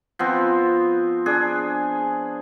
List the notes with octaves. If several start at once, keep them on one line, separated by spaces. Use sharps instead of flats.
F3 B3 C4
D4 G#4